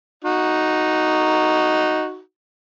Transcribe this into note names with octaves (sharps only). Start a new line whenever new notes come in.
D#4 F#4